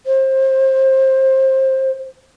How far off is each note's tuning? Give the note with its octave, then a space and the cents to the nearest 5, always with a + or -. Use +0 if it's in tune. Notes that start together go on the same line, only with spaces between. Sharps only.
C5 +25